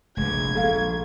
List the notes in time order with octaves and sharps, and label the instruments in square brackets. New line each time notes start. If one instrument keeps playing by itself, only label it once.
[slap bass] F1 A#1 [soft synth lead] G#3 [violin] G#6
[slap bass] A#1 [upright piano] A4 F5